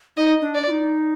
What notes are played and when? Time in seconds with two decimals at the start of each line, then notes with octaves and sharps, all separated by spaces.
0.17 D#4 D#5
0.41 D4
0.54 D5
0.67 F4
0.70 D#4